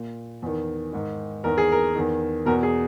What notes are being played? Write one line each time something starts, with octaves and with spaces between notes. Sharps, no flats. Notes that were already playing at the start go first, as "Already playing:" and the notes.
Already playing: A#2
E2 D#3
G#2 D#3
E2 D#3 A#4
G#4
A#4
E2 D#3
E2 B2 A#4
G#4